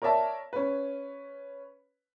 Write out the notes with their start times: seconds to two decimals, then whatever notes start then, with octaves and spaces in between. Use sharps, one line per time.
0.02 A#4 C#5 D5 E5 A5
0.53 C#4 B4